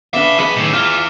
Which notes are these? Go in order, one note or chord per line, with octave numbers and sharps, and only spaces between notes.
B3 D4 G#4 E5 F5 D6 E7 G7
E2 B3 G#4 B4 D#5 B5 D#7
B1 A2 D#3
E2 E3 F4 F6